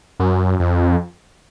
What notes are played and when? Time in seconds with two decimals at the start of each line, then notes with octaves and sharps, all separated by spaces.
0.20 F#2
0.60 F2